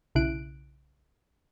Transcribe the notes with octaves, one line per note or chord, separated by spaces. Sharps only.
B1 C#3 E4 F#6 D7